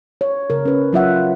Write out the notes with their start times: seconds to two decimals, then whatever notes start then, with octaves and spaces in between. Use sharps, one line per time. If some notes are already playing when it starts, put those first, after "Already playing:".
0.21 C#5
0.50 C#3 A#4
0.65 C#4 B4
0.93 F#3 F4 E5 F#5